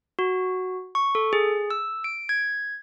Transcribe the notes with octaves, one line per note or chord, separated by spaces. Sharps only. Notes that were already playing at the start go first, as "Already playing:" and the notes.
F#4
C#6
A4
G#4
E6
D7
G#6